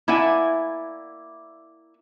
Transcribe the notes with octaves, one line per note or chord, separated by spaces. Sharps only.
A#3 E4 D5 E5 F#5 G#5